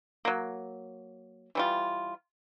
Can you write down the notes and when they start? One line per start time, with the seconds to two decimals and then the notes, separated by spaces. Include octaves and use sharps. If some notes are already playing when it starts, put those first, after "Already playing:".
0.25 F#3 A#3
1.55 E3 G3 F4